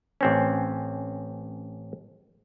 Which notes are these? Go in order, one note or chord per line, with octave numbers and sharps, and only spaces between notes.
A1 C4 C#4